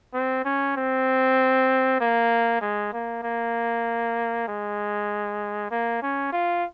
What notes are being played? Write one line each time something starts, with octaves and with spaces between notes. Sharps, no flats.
C4
C#4
C4
A#3
G#3
A#3
A#3
G#3
A#3
C#4
F4